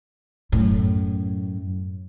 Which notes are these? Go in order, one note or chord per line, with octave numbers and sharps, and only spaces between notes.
F#2 A2